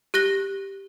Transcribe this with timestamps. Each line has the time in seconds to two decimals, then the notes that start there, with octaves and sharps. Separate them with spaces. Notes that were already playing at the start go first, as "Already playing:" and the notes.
0.14 G4 F#6 A#6 G7